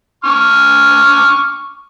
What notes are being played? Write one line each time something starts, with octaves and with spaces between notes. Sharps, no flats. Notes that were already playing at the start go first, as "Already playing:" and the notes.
C#6 D6 F6